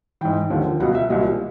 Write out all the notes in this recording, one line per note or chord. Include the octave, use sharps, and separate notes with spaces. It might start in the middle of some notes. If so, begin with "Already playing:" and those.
G#2 E3 G5
D#2 D3 F3
C#2 B2 F#3 F#5
E5
C2 A#2 F#3 D#5